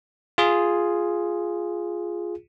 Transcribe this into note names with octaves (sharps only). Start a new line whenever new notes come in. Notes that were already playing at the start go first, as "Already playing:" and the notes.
F4 G#4